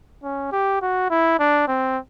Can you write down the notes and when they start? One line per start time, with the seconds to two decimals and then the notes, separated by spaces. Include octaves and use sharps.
0.23 C#4
0.52 G4
0.82 F#4
1.10 E4
1.39 D4
1.68 C4